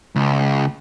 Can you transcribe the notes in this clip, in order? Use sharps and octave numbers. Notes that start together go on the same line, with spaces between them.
C#2